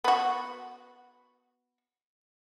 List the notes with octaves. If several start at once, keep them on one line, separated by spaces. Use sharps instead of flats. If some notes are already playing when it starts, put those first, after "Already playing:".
B3 F#4